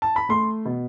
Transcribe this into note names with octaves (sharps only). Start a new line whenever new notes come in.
A5
B5
A3 C6
B2